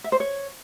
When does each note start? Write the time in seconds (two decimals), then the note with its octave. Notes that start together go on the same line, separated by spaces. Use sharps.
0.04 E5
0.12 C5
0.20 C#5